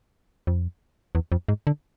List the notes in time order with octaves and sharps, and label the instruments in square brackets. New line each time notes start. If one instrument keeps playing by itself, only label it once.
[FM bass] F2
E2
F2
G#2
D3